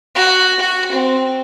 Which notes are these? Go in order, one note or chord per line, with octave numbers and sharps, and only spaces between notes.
F#4
F#4
C4